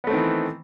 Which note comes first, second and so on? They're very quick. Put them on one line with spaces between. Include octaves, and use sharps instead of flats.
B3 A3 C4 D#3 E3